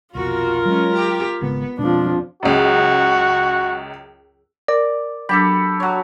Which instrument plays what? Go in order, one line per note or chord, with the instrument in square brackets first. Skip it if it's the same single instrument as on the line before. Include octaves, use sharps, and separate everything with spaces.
[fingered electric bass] B1 F2 C3 [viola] F4 A#4 [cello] F#4
[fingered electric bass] F#3 [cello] G#3 C#4
[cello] G4
[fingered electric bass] G#1 C#3 G#3 [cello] B3
[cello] F2 [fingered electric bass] B2 G#3 [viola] F3 D4
[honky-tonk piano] C#2 F#2 [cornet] F#4
[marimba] A#4 [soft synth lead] D5
[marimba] F#3 D4 [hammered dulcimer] G4 A4 [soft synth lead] B5
[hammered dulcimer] F#3 C#5